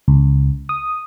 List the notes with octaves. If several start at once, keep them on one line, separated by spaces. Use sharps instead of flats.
C#2
D#6